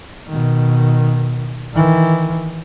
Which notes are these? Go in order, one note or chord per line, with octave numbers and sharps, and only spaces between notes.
B2 D#3
D#3 E3